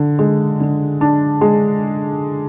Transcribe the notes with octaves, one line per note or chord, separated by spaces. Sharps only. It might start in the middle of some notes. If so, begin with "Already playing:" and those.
Already playing: D3
G#3
D3
D4
G#3